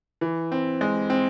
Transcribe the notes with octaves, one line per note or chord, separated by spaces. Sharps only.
E3
C4
G#3
C4